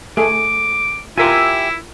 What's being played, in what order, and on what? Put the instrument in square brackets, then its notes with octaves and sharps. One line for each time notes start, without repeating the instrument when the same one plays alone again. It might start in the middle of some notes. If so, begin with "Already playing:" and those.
[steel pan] A3 G#4 [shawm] D6
[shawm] E4 [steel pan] F4 A#4 [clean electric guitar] G4 E5 G#5